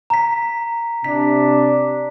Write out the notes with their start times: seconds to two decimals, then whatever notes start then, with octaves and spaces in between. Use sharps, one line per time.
0.10 A#5 B6
1.04 C3 D4 B6